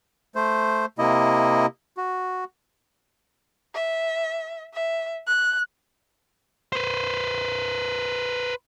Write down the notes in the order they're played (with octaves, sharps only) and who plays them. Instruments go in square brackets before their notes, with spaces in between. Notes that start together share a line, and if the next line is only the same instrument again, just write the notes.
[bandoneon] A3 C5
C3 A#3 E4 D#5
F#4
[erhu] E5
E5
F#6
[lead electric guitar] B4 C5